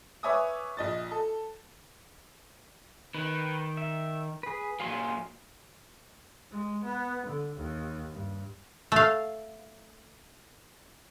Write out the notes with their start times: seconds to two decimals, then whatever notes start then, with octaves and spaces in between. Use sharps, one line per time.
0.23 B4 C#5 E5 G#5 D6 D#6
0.77 A#1 D#5 A6
1.11 A4
3.15 D#3 B4
3.77 E5
4.43 G#4 B4
4.80 A#2 F#3 F5 G#5 C6
6.51 G#3
6.83 B3
7.26 D3
7.56 D#2
8.12 G2
8.92 A3 F5